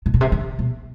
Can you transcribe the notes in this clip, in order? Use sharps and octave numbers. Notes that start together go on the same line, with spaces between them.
C3
B2
C3
D3
B2